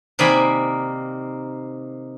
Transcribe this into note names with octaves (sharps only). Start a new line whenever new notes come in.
C3 D#3 A#3 D5 G#5 B5